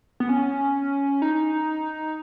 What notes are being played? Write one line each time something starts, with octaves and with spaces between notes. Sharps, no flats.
B3
C#4
D#4